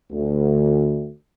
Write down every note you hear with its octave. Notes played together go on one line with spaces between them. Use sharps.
D2